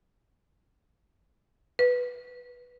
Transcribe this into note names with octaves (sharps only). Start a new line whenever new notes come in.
B4